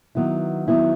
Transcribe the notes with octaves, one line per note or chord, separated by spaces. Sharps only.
D#3 F#3 B3 E4
D#3 F#3 B3 E4